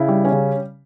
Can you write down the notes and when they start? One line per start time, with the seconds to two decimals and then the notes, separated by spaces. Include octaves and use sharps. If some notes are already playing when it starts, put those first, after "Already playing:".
Already playing: C#3 E4
0.08 G3
0.24 C#4
0.32 C#3